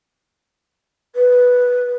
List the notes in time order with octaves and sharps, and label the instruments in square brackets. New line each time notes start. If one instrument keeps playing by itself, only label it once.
[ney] B4